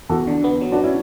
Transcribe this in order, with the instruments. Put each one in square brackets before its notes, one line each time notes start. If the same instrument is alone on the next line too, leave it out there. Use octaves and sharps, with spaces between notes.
[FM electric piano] E2 [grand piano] F#4 A4
[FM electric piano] D3
B3
F#3
[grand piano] D4 F#4
C#4 E4